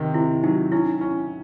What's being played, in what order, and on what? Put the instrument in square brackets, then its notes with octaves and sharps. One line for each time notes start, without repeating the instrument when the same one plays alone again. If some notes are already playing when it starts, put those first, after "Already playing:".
Already playing: [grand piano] C3 D#3
[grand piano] C3 [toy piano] E4
[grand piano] F#3 [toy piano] D#4
[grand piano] C#4 [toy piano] E4
[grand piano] C#4